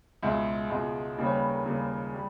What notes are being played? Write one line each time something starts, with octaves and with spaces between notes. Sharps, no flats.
C#2 B2 G#3 E5
C#2 B2 G#3
D#2 C#3 G3 A#3 D#5
C#5
B4
A#4
D#2 C#3 G3 A#3 G#4
G3